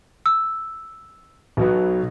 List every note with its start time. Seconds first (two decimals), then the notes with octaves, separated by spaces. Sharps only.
0.26 E6
1.57 B1 B2 F#3 B3